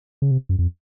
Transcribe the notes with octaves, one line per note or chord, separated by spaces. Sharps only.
C#3
C3
F#2
F2